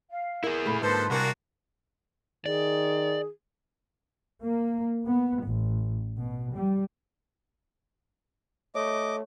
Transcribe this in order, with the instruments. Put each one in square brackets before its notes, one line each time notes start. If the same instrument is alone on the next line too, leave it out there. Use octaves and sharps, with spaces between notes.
[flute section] F5
[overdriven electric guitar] E4 G#4 [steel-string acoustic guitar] A#4
[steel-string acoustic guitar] A#2 C#3 A3 [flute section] B5
[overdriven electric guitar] G#2 [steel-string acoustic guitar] D3 A#3 [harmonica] F3 A4 C5 [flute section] B4 C6
[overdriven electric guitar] C2 [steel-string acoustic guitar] C3 A#4 G#5 [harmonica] A#3 D4 F#4
[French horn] D#3 [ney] G#4 [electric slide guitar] D5
[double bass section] A#3
B3
A1
B2
G3
[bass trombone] A3 [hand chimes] C#5 [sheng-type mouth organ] D#5 D6